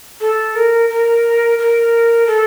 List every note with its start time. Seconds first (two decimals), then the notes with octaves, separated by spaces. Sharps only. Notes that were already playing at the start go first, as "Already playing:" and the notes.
0.20 A4
0.55 A#4
0.89 A#4
1.58 A#4
2.27 A4